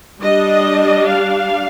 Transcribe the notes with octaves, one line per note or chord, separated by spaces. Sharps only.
G3 D4 D#5
F5